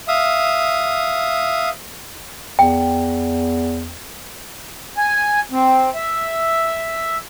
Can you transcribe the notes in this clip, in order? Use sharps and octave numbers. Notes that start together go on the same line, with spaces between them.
E5 F5 D#6
E2 G5
G#5
C4
E5